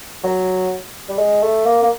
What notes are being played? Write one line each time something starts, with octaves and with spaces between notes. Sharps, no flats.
F#3
G3
G#3
A3
A#3
A#3